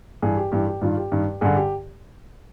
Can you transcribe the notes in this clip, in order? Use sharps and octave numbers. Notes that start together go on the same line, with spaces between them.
G2 E3 G#4
G4
G2 E3 G4
G4
G2 D#3 F4
G4
G2 D#3
G2 D3 G#4
G4